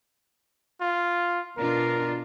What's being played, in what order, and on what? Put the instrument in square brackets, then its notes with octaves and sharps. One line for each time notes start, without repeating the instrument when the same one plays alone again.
[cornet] F4
[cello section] B2 D4 F4 [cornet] A#4